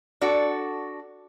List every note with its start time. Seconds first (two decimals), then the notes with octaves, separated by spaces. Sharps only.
0.21 D4 F#4 A4